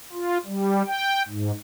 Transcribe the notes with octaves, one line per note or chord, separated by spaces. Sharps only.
F4
G3
G5
G#2